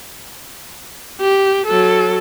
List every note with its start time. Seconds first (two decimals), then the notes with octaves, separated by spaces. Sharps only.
1.20 G4
1.67 F#3 A4